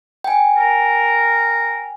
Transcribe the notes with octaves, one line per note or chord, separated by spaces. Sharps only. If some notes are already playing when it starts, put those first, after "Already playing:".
G5 G#5
A#4